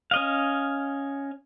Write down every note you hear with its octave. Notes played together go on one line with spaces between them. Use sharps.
C#4 D#5 F5